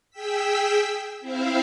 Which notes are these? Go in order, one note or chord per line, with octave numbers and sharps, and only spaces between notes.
G#4 G5 E6 B6
C4 E4 C5 E5 F5